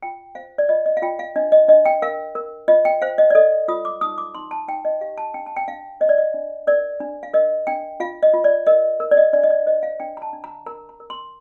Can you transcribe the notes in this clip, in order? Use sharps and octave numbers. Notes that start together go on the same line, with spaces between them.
F4 G5
C5 F5
D5
F4 D#5
D#5
F5
F4 G5
F5
D4 D#5
D#5
D4 D#5
G5
A#4 F5
A#4
F4 D#5
G5
C5 F5
D#5
D5
A4 D#5
F4 D#6
D6
D#4 D#6
D6
D#4 C6
A5
D#4 G5
D#5
G4 F5
A5
D4 G5
A5
G5
D4 F5
C5 D#5
D5
D#5
D4
A#4 D5
D4
F5
A#4 D#5
D4 G5
F4 F5
D#5
F4
D5
A#4 D#5
A#4
D5
D#5
D4 D5
D#5
D5
C5 D#5
F5
D4 G5
A#5
A5
D4
A#5
A#4 A#5
A#5
A#4
C6